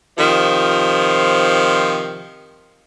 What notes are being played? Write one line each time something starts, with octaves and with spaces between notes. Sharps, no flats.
C3 D#3 F3